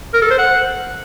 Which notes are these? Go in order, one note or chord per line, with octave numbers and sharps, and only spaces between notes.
A#4
A4
C5
F#5